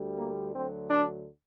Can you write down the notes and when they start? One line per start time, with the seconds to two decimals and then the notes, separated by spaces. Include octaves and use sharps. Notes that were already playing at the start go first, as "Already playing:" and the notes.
Already playing: D2 D3 G3
0.16 A#3
0.53 D2 D3 F#3 C4
0.90 D4